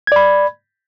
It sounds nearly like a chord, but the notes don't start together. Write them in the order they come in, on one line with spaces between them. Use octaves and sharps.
G#6 D5 B5